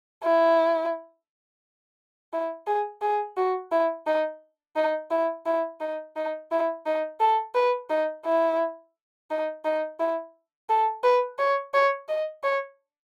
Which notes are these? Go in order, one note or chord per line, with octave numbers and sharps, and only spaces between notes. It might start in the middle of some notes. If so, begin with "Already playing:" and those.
E4
E4
G#4
G#4
F#4
E4
D#4
D#4
E4
E4
D#4
D#4
E4
D#4
A4
B4
D#4
E4
D#4
D#4
E4
A4
B4
C#5
C#5
D#5
C#5